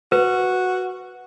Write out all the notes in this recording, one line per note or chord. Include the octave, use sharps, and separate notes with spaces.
F#4 B4